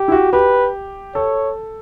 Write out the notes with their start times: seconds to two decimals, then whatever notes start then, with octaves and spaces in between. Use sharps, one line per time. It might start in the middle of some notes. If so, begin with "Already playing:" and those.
Already playing: G4
0.08 E4
0.12 F#4
0.33 G4 B4
1.15 A4 C#5